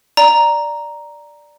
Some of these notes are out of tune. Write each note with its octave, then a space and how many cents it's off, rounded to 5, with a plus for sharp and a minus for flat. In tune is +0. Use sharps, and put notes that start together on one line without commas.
D5 +0 A#5 +0